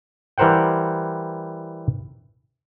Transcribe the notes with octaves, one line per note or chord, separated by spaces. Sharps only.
E3 G3 A#4 C5 F#5 G5